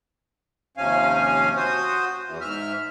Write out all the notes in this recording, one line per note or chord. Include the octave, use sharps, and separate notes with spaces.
D#2 C3 F3 C#4 F5 G#5
F#4 C5 D#6
E2 E3
G#2 E5 F6